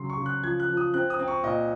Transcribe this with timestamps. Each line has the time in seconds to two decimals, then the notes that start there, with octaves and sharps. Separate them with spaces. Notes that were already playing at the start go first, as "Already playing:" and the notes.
Already playing: C#3 F#3 C6
0.10 C#6
0.17 C#3
0.26 F#6
0.43 F3 G#6
0.60 F#6
0.69 F3
0.77 D#6
0.94 C4 F#6
1.10 D#6
1.19 C4
1.28 C#6
1.44 A#2 D#5